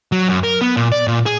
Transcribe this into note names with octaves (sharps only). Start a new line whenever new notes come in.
F#3
F#2
A#4
B3
A#2
D5
A#2
G#4